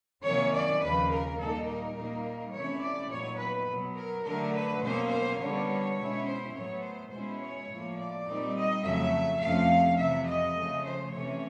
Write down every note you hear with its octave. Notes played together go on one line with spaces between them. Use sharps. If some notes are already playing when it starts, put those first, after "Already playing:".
C3 D#3 F#3 A#3 C#4 C#5
D5
D#2 C#3 F3 B4
A#4
A#2 G3 A#3 D#4 A4
A#4
A#2 G3 A#3 D#4
C3 E3 A3 C#4 E4 C#5
D5
A#2 F#3 B3 D#4 C#5
B4
B2 F#3 B3
A#4
D3 F#3 A3 A#4
B4
B2 F#3 A#3 C#4 C5
C5
D3 G3 B3 C#5
B2 G#3 C#4 E4
C5
A2 F#3 B3 C#5
C5
B2 G#3 C#4 E4 C5
C#5
A2 F3 A#3
D5
A#2 G3 C4 D#4
D#5
F2 C#3 F#3 A3 E5
F2 C3 F3 A3 C#4 F5
F2 C3 E3 E5
D#5
C#3 F3 A3
C5
C3 E3 A3 C#4 C#5